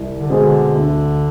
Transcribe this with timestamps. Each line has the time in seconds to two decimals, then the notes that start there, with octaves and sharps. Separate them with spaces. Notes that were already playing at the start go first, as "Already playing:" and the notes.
Already playing: C2
0.15 D3
0.29 B2 G#3 C4 G#4
0.44 D3
0.75 D2